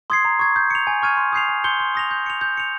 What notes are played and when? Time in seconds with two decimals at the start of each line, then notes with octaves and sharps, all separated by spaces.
0.10 C6 D#6 G#6 C7
0.25 A#5
0.39 C#6 G#6
0.56 G6
0.70 C#7 F7
0.87 G#5
1.02 C#6 F6 G#6 D#7
1.17 C6
1.32 D#6 G6 C7 F7
1.49 G#5
1.64 C6 G6 C#7 G7
1.80 C6
1.95 D#6 A#6 F7
2.11 G6
2.26 C#7 F7
2.41 G6
2.57 C#7 F7